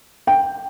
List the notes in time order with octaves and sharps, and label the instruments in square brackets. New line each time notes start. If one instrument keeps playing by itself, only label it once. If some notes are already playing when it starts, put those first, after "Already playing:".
[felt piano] G5